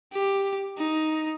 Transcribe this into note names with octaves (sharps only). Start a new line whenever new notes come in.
G4
D#4